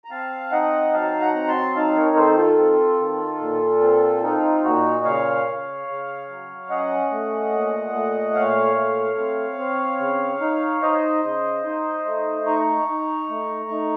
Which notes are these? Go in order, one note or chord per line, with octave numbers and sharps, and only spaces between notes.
A#5
C4 F5 A5
D#4 D#5 F#5
F#3 F5 A5
F#5 A#5
C4
A5 C6
D#4 F5 A5
A#4 C#5
D#3 A4 C5
F4 A4
C4
D#3
A#2
C4
D#4 F4
A#2 F#4
C#3 C#5 F5
C#3
C#3
F#3
C#4 D#5 F#5
A3
A#2
A3
A#2 C#5 F5
A3
C4
C4
C#3
D#4
D#4 C5 D#5
C#3
D#4
A3
D#4 A#5 C#6
D#4
A3
D#4